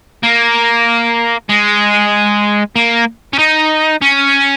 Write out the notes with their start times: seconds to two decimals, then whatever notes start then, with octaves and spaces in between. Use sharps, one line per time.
0.24 A#3
1.50 G#3
2.76 A#3
3.33 C#4
3.39 D#4
4.01 C#4